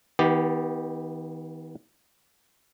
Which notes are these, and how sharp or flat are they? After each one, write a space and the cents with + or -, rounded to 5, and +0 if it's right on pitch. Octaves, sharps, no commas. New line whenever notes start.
D#3 +45 B3 +0 G4 +0